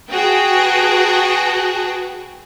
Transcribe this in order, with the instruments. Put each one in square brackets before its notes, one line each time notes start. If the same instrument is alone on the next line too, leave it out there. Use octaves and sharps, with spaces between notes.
[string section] F#4 G#4 B4 G5 A5